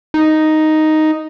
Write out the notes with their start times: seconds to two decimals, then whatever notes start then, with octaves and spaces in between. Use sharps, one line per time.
0.14 D#4